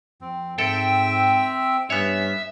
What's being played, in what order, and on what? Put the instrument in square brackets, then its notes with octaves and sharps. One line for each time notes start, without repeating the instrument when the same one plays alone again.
[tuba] F2 [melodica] C4
[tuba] G#2 [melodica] C4 E5 E6 [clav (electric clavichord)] A4 [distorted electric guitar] G5
[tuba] G2 [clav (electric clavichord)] B3 C#5 [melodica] C#4 [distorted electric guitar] E5